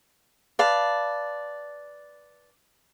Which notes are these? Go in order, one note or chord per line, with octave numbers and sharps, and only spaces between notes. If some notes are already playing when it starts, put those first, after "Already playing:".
B4 D5 F5 A5